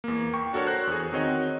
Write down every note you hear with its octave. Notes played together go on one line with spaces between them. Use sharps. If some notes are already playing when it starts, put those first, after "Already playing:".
E2 A#3
G5 C#6
D4 F#4 A4 A#4 C#5
C5 F#6 A#6
E2 G#4
D#3 C4 F#4 C#5 D#5